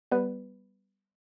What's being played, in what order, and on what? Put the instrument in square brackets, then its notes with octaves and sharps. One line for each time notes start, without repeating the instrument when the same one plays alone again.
[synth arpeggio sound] G3 B3 B4